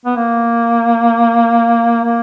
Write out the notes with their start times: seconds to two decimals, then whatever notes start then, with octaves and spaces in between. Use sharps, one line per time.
0.05 B3
0.16 A#3
2.04 A#3